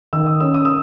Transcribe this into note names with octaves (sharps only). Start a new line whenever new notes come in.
D#3 E6
D#6
C#4 E6
D#6
E6